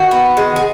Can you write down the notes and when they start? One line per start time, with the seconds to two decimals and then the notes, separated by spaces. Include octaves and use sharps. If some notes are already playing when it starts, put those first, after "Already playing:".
Already playing: D#3 F#4
0.11 B3
0.37 G#3
0.56 G#4